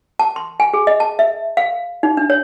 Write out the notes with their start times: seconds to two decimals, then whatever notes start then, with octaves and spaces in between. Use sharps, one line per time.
0.19 A5
0.36 C6
0.60 G#5
0.74 G#4
0.87 D#5
1.00 A5
1.19 E5
1.57 F5
2.03 D#4
2.17 D4
2.30 C#5